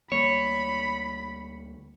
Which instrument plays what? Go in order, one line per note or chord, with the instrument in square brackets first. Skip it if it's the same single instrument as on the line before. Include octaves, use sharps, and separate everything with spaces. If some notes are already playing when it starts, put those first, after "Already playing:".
[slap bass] D2 G3 A#3 [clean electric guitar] C#5 [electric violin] B5